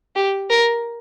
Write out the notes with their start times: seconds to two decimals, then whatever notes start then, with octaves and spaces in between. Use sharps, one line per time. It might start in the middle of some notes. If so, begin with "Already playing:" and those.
0.16 G4
0.50 A#4